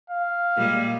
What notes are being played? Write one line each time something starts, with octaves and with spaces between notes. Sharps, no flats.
F5
A#2 G3 G#3